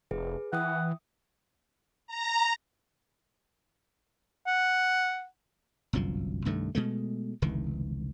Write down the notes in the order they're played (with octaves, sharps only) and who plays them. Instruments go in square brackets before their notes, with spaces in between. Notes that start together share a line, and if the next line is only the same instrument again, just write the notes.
[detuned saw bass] F1 [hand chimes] G#4 B4
[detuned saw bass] E3 [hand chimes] E5 G5 D#6 [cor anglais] F#5
[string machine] A#5
[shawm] F#5
[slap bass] G1 C2 F#2 F3
C2 G2 D#3 A3
B2 G#3 A3
F1 C#2 D#3 E3